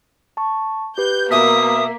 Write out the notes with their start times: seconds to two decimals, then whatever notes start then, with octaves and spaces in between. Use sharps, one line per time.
0.37 A5 C#6
0.98 G4 B4 G6
1.31 B2 A#3 E5 D6 D#6 B6